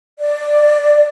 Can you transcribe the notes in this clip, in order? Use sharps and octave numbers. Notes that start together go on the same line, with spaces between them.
D5